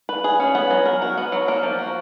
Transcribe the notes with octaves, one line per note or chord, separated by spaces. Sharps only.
B4
G#4
C#4
B3
F#3
A#4
F#4
B3
F#3
A#3
F3
F#4